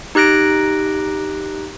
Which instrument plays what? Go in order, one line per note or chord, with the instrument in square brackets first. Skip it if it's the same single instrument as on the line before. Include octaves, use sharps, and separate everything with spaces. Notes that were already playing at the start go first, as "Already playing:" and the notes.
[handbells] D#4 G4 F#6 A#6 D7